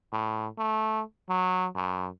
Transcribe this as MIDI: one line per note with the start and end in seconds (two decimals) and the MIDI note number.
0.13 0.47 45
0.58 1.01 57
1.29 1.67 54
1.76 2.09 42